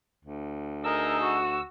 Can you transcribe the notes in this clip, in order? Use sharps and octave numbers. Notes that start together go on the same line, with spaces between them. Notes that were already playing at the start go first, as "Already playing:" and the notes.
D2
D#4 G#4 A#4 E6
F#4